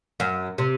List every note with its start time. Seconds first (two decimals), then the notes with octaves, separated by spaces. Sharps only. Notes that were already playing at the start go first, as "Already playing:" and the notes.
0.20 F#2
0.58 C3